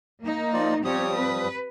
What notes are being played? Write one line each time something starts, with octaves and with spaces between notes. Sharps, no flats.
A#3 D#4
F3 F4 D5
F3 G3 C4 G4 C#5 D#6
B4